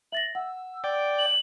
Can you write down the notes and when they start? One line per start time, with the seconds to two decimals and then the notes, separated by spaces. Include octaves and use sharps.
0.12 E5 A6 A#6 F#7
0.35 F#5 E6
0.84 D5 G5
1.18 F#7